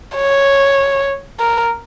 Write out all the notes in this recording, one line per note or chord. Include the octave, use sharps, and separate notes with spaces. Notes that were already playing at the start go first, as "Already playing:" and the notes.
C#5
A#4